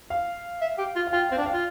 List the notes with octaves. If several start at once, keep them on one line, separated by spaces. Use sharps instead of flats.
F5
E5
G4
F4
F5
F4 G5
C4 F5
D4
G5
F5
F4